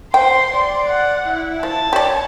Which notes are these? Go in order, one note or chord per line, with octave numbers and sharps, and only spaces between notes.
C5 G5 C6
D5
F#5
E4
F3 A5
G4 C#5 D5